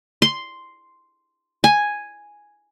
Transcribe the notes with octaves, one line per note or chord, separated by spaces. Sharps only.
C6
G#5